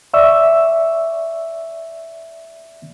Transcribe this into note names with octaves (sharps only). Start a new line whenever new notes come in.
D5 E5 C#6 E6